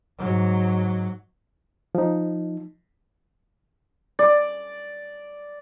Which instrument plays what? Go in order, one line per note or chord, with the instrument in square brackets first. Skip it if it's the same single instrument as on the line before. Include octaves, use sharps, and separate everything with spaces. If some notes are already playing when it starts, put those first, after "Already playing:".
[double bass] G#2 F#3
[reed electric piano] F3 D#4
[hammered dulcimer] D5